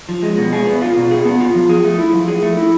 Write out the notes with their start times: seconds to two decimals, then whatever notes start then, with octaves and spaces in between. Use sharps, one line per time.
0.09 F3
0.23 G#3
0.38 B2
0.53 G#4
0.66 B3
0.82 F4
0.96 B2
1.11 G#4
1.25 B3
1.40 F4
1.55 F3
1.69 G#4
1.85 A3
1.98 E4
2.13 F3
2.28 G#4
2.43 A3
2.57 E4